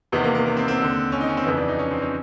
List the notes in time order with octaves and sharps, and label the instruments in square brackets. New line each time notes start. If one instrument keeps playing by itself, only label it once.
[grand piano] E2 C3 D#3 B3
A#3
A#3
B3
C4
C4
D#2 D3
C#4
D#4
C#4
C4
F2 C#3 E3 B3
D4
D#4
C#4
C4
C#4